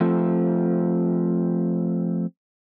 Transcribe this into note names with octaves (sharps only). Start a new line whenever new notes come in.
F3 A3 C4